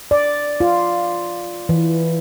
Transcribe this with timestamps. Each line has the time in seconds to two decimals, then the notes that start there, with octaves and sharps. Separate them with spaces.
0.11 D5
0.60 F4
1.69 E3